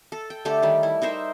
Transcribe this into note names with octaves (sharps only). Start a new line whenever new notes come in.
A4
G5
D3 A3 G4 A4
D#3 G3
E4
D#4 A#4 C5 E5